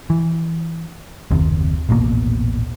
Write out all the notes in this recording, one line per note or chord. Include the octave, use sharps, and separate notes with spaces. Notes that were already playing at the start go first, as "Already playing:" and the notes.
E3
F#1 D#2 C3
D#1 A1 B2 A#3